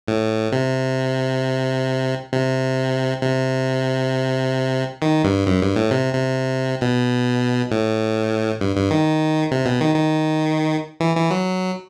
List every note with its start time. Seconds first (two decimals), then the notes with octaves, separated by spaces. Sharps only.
0.08 A2
0.52 C3
2.32 C3
3.22 C3
5.02 D#3
5.24 G2
5.47 F#2
5.62 G2
5.76 A2
5.91 C3
6.14 C3
6.81 B2
7.71 A2
8.61 G2
8.76 G2
8.91 D#3
9.51 C3
9.66 B2
9.81 D#3
9.95 D#3
11.00 E3
11.16 E3
11.30 F#3